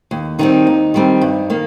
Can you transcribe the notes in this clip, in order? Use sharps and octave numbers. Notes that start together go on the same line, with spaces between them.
D#2
D#3 G3 C4 D#4
D#2
D#3 G3 C4
G2
D#3 A#3